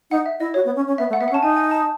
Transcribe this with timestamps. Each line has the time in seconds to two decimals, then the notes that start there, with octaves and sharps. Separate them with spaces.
0.11 D#4 F#5
0.26 E5
0.40 E4 D#5
0.54 F#4 C#5
0.65 B3
0.76 C#4
0.88 C#4
0.98 B3 E5
1.10 A3
1.13 F#5
1.20 B3 E5
1.28 C#4 F#5
1.34 A5
1.42 D#4 G#5
1.57 G#5
1.71 A5